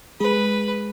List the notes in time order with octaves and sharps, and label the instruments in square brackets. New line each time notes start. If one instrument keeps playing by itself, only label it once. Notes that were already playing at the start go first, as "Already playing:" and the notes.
[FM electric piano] G#3 G#4 [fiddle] B4